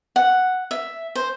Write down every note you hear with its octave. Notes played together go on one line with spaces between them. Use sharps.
F#5
E5
C5